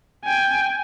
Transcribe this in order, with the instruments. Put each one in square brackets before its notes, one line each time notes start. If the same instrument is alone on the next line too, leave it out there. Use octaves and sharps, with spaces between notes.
[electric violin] G5 G#5